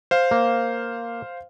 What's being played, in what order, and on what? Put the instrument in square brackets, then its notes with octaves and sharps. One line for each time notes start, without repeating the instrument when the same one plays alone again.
[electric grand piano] C5 F5
[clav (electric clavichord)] A#3